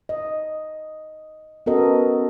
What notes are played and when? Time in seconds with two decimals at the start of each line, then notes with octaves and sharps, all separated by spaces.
0.09 D#5
1.66 B3 C#4 F#4 A4 A#4 D#5